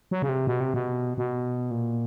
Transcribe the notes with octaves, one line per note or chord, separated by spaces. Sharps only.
F#3
C#3
C3
B2
C3
B2
B2
A#2